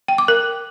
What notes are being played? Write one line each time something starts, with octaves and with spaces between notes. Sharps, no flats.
G5
D6
A#4